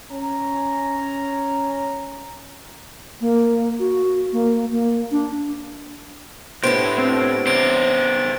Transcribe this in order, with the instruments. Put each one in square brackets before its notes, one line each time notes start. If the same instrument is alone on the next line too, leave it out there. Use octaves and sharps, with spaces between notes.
[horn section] C#4 A#5
[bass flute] A#3
F#4
A#3
A#3
D4
[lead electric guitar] A2 [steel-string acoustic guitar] B3 D4 G4 [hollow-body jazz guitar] C5 [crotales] D7
[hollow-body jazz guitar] C4
[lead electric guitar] C#3 C5 [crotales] D7